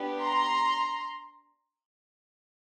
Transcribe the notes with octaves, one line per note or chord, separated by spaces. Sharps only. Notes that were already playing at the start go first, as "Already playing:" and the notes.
Already playing: B3 D4 G4
A#5 C6